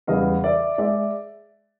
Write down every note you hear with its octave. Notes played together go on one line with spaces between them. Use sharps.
E2 C#3 E3 G3 D#5 F5
D5 E5
G#3 D5 E5